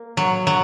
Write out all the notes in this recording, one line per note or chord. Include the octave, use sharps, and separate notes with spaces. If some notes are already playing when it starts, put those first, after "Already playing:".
Already playing: A#3
F#3
F#3